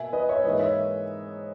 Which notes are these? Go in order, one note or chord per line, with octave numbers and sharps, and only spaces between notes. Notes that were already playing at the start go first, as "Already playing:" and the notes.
Already playing: B2 A#3 E5 G#5
B4 D#5
C#5 E5
G#2 E3 A#3 B4 D#5
C#5 E5